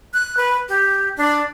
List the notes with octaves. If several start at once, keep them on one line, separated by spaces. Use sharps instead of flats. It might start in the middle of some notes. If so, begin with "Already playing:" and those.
F#6
B4
G4
D4